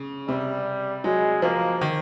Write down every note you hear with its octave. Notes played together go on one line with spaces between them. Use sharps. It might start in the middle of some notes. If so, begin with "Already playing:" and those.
Already playing: C#3
C3 G3
F#3 G#3
F3 A#3
D#3